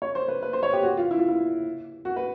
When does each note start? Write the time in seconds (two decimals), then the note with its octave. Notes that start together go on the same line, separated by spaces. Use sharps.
0.02 C#5
0.15 C5
0.28 B4
0.42 B4
0.53 C5
0.63 C#5
0.73 G4
0.83 F#4
0.97 F4
1.11 E4
1.19 F4
1.28 E4
2.05 F#4
2.16 B4